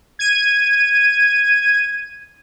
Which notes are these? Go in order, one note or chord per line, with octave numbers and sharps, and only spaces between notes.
G#6 D#7